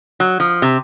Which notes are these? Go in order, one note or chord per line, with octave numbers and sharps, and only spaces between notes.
F#3
F3
C3